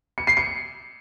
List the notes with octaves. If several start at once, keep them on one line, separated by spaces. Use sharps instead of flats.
C#7
C7
C#7